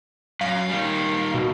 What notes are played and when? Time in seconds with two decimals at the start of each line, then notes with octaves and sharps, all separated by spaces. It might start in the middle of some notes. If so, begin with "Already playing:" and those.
0.41 F#2 F5
0.70 D#3 G3
1.34 B2